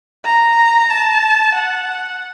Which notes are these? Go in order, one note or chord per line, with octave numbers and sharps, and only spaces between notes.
A#5
A5
F#5